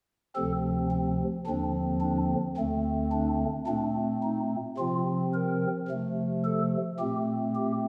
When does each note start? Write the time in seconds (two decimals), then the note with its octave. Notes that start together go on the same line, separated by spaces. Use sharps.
0.35 D2 C3 F3 C4 A4
0.91 C4
1.46 D#2 D3 F3 C4 D4
2.01 D4
2.57 D2 D3 A3 C4
3.12 D4
3.67 A#2 A3 C4 D4
4.23 D#4
4.77 C3 F3 C4 F4
5.34 A#4
5.88 C3 F3 A3
6.44 A4
6.99 A#2 A3 C4 G4
7.55 G4